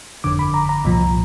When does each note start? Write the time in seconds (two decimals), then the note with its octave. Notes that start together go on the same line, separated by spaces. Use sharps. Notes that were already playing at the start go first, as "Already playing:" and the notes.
0.24 G1 F2 D3 D6
0.39 B5
0.54 A#5
0.69 A#5
0.85 C2 A#2 F3